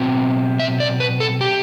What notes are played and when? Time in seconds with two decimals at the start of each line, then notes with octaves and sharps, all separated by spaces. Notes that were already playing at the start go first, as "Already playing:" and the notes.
Already playing: B2 F#3 C4
0.60 E5
0.80 D5
1.00 B4
1.20 A4
1.41 G4